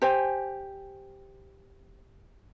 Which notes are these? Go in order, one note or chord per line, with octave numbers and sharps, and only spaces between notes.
G4 C5 G#5